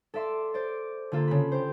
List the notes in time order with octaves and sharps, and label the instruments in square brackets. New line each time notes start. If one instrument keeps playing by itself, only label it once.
[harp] A4 D5 E5 C6
C5 D5
D3 A#3 F4 A4
C#3 B5
G4 C5